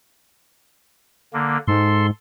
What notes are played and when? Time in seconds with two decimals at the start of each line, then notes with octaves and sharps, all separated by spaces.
1.33 D3 A#3
1.68 G#2 A4 C6